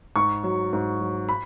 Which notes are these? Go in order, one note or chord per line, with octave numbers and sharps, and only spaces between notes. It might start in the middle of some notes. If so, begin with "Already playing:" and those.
G#2 C#6
F#3
G#2
F#3
B5